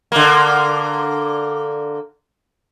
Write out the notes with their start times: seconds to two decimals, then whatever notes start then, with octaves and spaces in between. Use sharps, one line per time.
0.12 D3 A#3